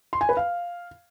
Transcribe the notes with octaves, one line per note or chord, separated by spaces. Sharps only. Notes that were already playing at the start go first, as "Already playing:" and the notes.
C6
G#5
B4
F5